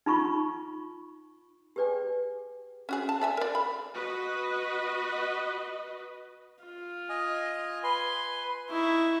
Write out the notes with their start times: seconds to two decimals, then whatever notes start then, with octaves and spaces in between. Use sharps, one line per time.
0.06 D#4 F4 B5 C#6
1.76 G4 G#4 B4 D5 G5 G#5
2.89 C#4 F#4 G#4
3.09 A5
3.21 D5 E5 G#5
3.37 A#4 D5
3.55 B5
3.94 F#4 B4 D#5
6.64 F4
7.09 D#5 G#5
7.83 B4 G#5 C6
8.70 D#4 E4 C#6